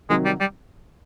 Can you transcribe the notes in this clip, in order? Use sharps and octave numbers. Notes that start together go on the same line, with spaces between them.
C3 D#3 F#3 G#3
G3
G3